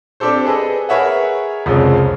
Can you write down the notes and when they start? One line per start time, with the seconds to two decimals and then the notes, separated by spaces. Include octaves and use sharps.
0.20 C4 D4 G4 A4 C5
0.45 G#4 A4 B4 D#5
0.89 G#4 A#4 B4 C#5 E5 F#5
1.66 C2 F2 C#3 G#3